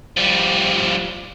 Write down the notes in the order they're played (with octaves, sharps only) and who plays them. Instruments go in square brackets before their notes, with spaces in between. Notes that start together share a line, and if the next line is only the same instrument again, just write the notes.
[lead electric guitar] F3 G3